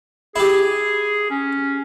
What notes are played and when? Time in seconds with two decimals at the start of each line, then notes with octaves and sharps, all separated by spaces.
0.36 E4 G4 G#4
1.31 C#4